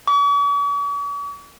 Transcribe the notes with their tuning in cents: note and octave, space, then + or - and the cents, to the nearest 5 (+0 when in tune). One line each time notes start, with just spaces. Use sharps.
C#6 +45